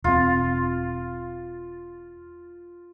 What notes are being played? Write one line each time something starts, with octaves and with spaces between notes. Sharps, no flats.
E1 C4 F4